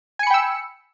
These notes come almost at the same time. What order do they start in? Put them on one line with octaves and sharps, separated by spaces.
G#5 C#7 B5 G5 E6